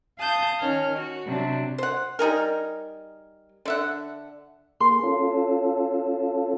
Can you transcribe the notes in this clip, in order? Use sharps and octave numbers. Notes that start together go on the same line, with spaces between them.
F5 A5 D#6 G6
D#3 C#4 F6
F#4
C3 F#3 D4
C5 F#5
G3 D#4 G#4 A#4
D3 E5 F#5
A#3 G#4 C6
C#4 F4 A4